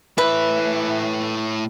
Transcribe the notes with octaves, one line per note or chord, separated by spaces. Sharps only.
A2 E3 B4 E5